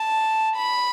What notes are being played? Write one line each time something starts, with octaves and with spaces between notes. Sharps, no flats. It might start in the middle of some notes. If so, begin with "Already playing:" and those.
Already playing: A5
B5